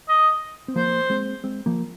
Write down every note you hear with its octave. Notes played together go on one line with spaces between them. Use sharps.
D#5
C4
F3 A#3 C5
G#3 C4
G#3 C4
F3 A#3